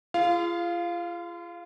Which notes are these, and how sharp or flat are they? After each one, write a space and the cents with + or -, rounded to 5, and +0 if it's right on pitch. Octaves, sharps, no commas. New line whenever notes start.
F4 -35 G#4 +0 F5 +0